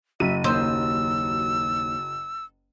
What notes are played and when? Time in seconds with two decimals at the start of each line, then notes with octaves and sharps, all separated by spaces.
0.20 F#1 F#3 E5 D#7
0.44 D#2 C5 E6